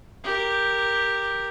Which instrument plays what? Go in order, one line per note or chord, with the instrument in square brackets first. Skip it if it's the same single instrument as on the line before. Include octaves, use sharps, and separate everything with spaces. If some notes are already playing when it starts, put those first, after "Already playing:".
[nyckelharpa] G4 A#4